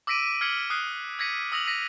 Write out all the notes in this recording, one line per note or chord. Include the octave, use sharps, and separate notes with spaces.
D6 E6 A#6 B6 D7 D#7
F6 G#6 B6 C#7 F#7
D#6 F6 F#6 C7 C#7
E6 G#6 A#6 B6 C#7 D#7
D#6 E6 A#6 F7 F#7
A#6 B6 D#7